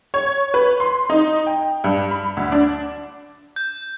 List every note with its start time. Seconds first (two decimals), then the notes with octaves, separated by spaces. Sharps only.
0.14 C#5
0.54 B4
0.80 C6
1.10 D#4
1.47 G5
1.84 G2
2.11 B5
2.37 D2
2.52 D4
3.56 G6